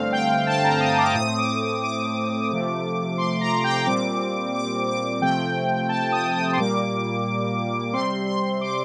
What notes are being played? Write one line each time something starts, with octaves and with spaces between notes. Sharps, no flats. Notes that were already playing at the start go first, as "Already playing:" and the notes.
Already playing: G2 D3 A3 C4 F5
G5
A5
A#5
D#6
D6
A2 A3 C4 D#6
D6
D#6
D6
C3 F3 A3
C6
A#5
G5
A#2 G3 C4 D6
D6
D6
C3 F3 A3 C4 G5
A5
D#6
D#6
C6
A#2 G3 A#3 D6
C3 G3 C4 C6
C6
D6